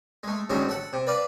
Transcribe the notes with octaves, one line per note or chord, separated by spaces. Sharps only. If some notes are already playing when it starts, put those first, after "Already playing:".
G#3 A3
A1 D2 G#2 F#3 G#3 A5
A4 F#5
C3
B4 D5 F5 A5